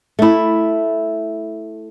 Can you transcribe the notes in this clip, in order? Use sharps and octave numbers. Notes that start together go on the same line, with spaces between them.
A3 E4